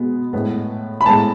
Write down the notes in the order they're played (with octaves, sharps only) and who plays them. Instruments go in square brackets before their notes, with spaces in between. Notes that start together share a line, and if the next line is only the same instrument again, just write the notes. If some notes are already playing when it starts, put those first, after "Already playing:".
Already playing: [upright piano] B2 G#3 B3
A2 G#3 B3
B5
A2 G#3 B3 A5